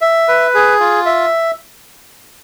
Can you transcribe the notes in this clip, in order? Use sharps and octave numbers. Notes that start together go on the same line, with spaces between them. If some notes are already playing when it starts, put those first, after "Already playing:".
E5
B4
G#4
F4
E5